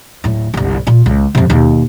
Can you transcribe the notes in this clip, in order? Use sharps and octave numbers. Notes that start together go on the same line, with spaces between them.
D1 A2
G1 C2
A#2 F4
C#2
F2 C3
D#2 B2